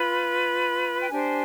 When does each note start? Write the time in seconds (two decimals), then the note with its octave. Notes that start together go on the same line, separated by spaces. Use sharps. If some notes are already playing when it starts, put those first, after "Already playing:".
Already playing: F4 B4 B5
1.01 G5
1.09 D4 G4 C5 G#5